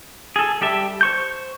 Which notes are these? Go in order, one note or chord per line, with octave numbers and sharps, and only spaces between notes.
G#4 A4
G3 G4 A4 E5
C5 C#6 G6